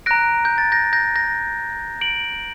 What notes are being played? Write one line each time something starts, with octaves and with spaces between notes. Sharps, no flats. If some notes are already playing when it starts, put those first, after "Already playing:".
A#5 F#6 A#6 D7
G6
A6
G6 A#6
G6 A#6
G6 A#6
D7 F#7